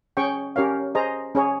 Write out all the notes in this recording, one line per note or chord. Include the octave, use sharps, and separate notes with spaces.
C#4 G#4 C#5 G5 C#6
C#4 G4 A#4 C#5 F5
G#4 C5 D#5 A#5
C#4 G#4 C#5